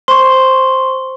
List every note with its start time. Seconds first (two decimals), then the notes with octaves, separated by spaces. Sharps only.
0.08 C5 C6 C#6